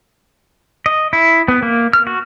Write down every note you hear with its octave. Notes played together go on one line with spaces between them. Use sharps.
D#5
E4
B3
A#3
F6
F#4